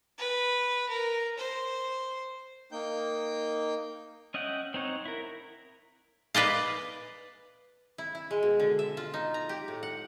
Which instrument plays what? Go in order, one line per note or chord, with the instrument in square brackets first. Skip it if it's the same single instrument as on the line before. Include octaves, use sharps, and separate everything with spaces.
[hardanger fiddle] B4
A#4
C5
[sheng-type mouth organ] A#3 D#4 G5 G6
[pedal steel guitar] C#4 D#5 E5 F#5 G5
C4 D#4 C#5 F#5
E4 A#4
[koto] B4 D5 D#5 F5
E4
E4
G#3
B2
D3
E5
F4
D#4
A#5
G4
A2
F#5